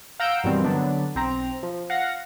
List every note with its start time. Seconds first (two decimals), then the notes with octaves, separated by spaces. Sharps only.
0.20 F5 F#5 A#5 E6 G6 D7
0.44 G2 B2 D#3 E3 G3 C4
0.64 D3 F#3 B3 D4
1.15 B1 C4 A#5
1.63 F3
1.90 F5 F#5 A#6